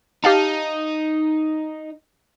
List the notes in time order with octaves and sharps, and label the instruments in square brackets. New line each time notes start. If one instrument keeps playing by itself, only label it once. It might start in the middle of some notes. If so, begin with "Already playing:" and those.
[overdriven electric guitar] D#4 [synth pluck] G4 F5 A5